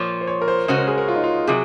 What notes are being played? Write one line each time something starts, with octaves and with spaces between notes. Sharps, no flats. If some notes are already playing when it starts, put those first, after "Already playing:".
Already playing: A#2 F3 A#3 C#5
C5
C#5
A#4
C5
C#3 G#3 C#4 F#4 C5
A#4
G#4
A#4
F4
D#4
F4
C3 F#3 G#4